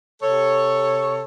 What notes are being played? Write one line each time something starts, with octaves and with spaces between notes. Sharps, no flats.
C3 A4 C#5